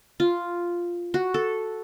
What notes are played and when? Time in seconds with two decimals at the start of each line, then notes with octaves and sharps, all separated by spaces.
0.20 F4
1.14 F#4
1.34 A4